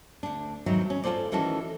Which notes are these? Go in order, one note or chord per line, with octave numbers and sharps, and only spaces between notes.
D2 D4
E2 G#2 D#3 F#3
C#4
F4 G#4 A4 C5 D5
D#3 E3 C#4 F#4 A4